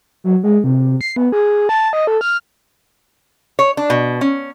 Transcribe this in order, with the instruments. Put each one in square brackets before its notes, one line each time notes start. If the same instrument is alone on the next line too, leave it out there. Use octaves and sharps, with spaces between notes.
[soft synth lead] F#3
G#3
C3
C7
B3
G#4
A5
D#5
A4
F6
[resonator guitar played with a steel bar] C#5
D4
B2
C#4